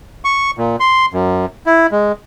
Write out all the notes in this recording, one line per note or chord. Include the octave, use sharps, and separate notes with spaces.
C#6
A#2
C6
F#2
E4
G#3